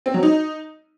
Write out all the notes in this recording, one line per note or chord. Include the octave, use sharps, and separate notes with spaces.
C4
F#3
D#4